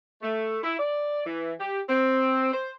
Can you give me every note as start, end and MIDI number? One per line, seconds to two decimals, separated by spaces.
0.22 0.58 57
0.64 0.77 64
0.79 1.25 74
1.26 1.54 52
1.60 1.80 67
1.89 2.52 60
2.53 2.72 72